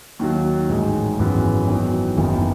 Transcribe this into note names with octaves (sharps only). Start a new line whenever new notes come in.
D#2 D#3 F#3
A1 G#2 D#3 G#3
G#1 F#2 E3 G#3 B3
E2 D#3 F#3
F#1 E2 D#3